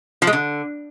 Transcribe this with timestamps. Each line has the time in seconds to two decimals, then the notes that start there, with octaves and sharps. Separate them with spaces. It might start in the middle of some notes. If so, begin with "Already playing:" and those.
0.22 F3
0.27 G#3
0.33 D3